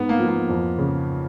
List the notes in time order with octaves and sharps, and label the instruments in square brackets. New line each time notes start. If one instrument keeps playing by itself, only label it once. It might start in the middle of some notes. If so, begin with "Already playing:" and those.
Already playing: [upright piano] G#2 [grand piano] B3
[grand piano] A#3
[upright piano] F3
[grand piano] A#3
[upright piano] F2
C#3